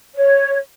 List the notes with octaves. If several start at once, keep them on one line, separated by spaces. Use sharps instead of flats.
C#5